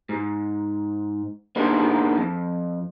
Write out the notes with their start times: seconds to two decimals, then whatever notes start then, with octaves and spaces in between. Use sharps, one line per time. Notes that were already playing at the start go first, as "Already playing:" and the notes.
0.09 G#2
1.56 A#3 B3 D4 D#4 G#4 C5
2.17 F2